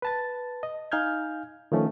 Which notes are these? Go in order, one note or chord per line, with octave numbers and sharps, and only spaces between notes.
B4 A5 A6
D#5
D#4 F5 G#5 F6 G6 G#6
D#3 F3 A3 C#4